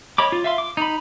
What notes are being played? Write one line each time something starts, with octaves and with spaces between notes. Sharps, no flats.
C#5 D#5 B5 D6
F4
E5 F5 C6
D6
D#4 B5